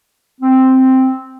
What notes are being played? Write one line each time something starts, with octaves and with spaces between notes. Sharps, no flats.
C4